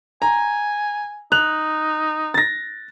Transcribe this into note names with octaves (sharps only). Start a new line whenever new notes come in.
G#5 A#5
D#4 F#6 F7
A6 A#6